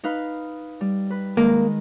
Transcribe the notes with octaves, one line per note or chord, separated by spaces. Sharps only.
D#4 B4 F5
G3
B4
D#3 G#3 A#3